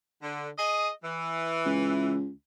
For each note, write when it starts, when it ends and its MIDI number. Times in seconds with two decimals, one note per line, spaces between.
0.22 0.49 50
0.58 0.89 68
0.58 0.89 75
1.03 2.16 52
1.65 2.30 37